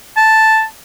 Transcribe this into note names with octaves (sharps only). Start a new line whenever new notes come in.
A5